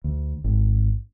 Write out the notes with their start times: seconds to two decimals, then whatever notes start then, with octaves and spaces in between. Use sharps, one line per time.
0.04 D2
0.44 G#1